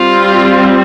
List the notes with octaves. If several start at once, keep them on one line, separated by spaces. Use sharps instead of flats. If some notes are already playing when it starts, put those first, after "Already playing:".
Already playing: G3 C4 F4